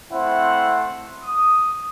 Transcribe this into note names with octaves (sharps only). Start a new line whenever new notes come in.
A3 C4 E4 C5 F#5
D#6